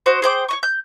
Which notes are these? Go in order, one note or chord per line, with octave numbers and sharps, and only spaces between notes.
F#4 C5 D#5
G#4 C5 G5 D6
C#5 D#5 C#6
G6